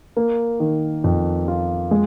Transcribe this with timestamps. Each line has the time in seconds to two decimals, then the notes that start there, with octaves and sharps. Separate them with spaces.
0.16 A#3
0.60 D#3
1.04 F2
1.48 F4
1.91 G#3